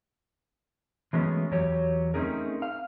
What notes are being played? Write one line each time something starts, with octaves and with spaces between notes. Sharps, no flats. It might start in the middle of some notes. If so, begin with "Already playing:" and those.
E3 F#3 G#3 A3 B3 C#4
E2 F#3 G4 C#5
A3 C4 C#4 D#4 G#4 A#4
F5